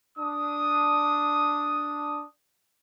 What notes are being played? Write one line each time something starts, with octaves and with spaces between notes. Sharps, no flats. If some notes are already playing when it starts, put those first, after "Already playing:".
D4 D#6